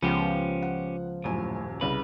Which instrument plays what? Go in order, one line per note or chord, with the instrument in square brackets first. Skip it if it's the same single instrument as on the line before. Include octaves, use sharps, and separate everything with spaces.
[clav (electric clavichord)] C#2 B3 [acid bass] F3 [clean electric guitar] C#4 G4 [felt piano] B4
[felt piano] F#5
[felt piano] D#1 F#2 G#5 [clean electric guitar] A2
[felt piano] C2 C#3 [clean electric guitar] B4